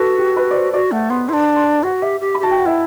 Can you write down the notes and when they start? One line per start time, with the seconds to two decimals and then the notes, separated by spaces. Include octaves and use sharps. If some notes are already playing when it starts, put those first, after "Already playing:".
Already playing: F#4 A4 B4
0.18 G4
0.37 B4
0.51 D5
0.55 C5
0.73 F#4 D5
0.92 A3 F#5
1.10 B3 C6
1.29 E4 C6
1.33 D4
1.56 C6
1.83 F#4 F#5
2.02 G4 E5
2.20 G4
2.35 B5
2.40 G4
2.43 F#4 A5
2.51 G5
2.59 F#5
2.66 E4 E5